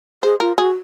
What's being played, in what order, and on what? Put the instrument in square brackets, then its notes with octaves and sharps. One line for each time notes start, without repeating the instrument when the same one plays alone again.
[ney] G#4 [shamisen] C5
[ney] F4 [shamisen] A#4
[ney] F#4 [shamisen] G#4